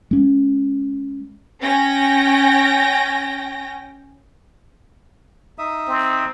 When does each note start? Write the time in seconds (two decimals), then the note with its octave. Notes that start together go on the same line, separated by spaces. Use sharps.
0.11 G#3 C#4
1.61 C#4 G5 A#6
5.58 D#4 E5 D#6
5.88 C4